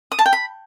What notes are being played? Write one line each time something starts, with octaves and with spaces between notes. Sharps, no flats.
D#6
A5
G5
B5